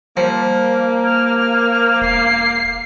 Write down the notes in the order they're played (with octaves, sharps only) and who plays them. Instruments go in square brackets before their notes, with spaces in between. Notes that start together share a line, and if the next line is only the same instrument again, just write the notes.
[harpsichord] F3 [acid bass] G3 [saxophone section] A#3
[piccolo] F6
[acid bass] E1 [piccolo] C7